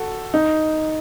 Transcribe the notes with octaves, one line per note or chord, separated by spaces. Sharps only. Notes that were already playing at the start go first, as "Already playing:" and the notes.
Already playing: F#4 A4
D#4